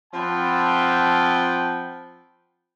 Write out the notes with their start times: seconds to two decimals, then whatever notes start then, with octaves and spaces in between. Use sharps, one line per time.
0.13 F3 C4 F#5 G5 A5 B5